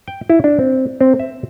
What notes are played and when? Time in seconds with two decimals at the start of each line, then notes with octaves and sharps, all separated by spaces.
0.08 G5
0.30 E4
0.44 D4
0.59 C4
1.01 C4
1.20 E5